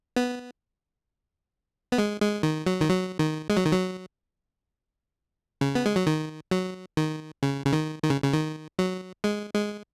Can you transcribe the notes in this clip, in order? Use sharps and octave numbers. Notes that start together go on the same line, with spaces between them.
B3
B3
G#3
G#3
D#3
F#3
D#3
F#3
D#3
G#3
F#3
D#3
F#3
C#3
B3
G#3
F#3
D#3
F#3
D#3
C#3
C#3
D#3
D#3
C#3
C#3
D#3
F#3
G#3
G#3